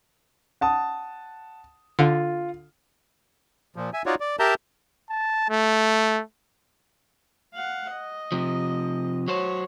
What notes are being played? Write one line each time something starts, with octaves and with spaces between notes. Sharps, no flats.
F#5 A5 D#6
D3 F4
A#2 F3
E5 G#5
D#4 F4 F#4 C#5 D5
D5
G4 A#4 E5 A5 A#5 G6
A5
A3
F5 F#5
D#5
C3 F3
F#3 F#4 C5 C#5